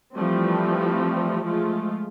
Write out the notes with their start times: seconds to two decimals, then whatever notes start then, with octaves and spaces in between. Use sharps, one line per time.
0.15 E3 F3 G3 A3 C4
1.44 F3 G#3 A3 F4